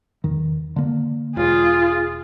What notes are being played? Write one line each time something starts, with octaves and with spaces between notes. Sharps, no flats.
E2 D#3
D3 A#3
E1 F4 G#4